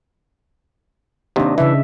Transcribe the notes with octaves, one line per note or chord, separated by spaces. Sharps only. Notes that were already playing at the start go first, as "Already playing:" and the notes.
D#2 C3 D4 D#5
C#3 E3 E5